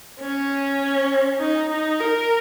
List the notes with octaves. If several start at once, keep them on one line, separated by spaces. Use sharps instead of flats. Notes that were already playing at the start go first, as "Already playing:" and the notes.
C#4
D#4
D#4
A#4